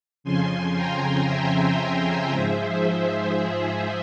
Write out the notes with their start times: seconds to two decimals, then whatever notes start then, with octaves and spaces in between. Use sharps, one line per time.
0.24 F2 C#3 F3 G#5 C6
0.76 G5 A#5
1.27 E5 G5
2.30 G#2 F3 G#3 C5 E5
3.34 G#4 C5